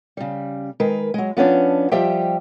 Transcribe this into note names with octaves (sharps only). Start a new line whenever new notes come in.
C#3 G3
D#3 G#3 A#4 B4
F#3 G#3
F3 B3 C#4 D4
F3 G3 G4 D#5 E5 G5